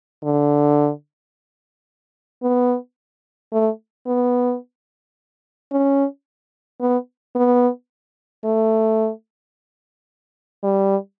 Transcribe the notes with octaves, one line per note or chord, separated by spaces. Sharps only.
D3
B3
A3
B3
C#4
B3
B3
A3
G3